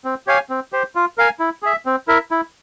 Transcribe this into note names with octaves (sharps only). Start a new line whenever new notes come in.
C4
G4 C#5 F5 G#5
C4
G4 C5
F4
A#4 F5 G#5
E4
G#4 E5
C4
E4 A#4 E5
E4